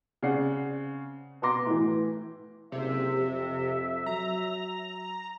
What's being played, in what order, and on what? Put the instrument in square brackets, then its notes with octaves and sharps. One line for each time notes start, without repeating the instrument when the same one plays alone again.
[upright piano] C#3 C4 D5 F#5 C7
B2 B3 A#5 C6 D6 A#6
A2 E3
[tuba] F#1 [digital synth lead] C3 [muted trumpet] E5
[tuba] F2
[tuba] F#3 [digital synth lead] A#5